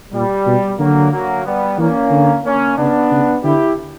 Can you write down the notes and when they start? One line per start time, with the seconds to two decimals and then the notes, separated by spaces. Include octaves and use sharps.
0.13 A#2 G3
0.47 B2
0.79 D3 F#3 A#3
1.12 F#3 A#3
1.45 G3 B3
1.78 E3 A#3 C#4
2.11 D3
2.44 A#3 C#4
2.77 C#3 B3 D4
3.11 C#3
3.43 D3 E4 G4